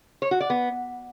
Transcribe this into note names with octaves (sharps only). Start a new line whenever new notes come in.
C#5
F#4
D5
B3